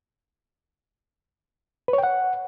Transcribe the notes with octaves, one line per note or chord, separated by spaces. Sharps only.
B4
C#5
G5
F#5